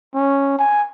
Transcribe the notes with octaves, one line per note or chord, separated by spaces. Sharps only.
C#4
G#5